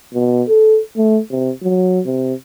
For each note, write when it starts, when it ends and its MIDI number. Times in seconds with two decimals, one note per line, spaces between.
0.14 0.43 47
0.48 0.79 69
0.97 1.20 57
1.30 1.51 48
1.62 2.00 54
2.05 2.34 48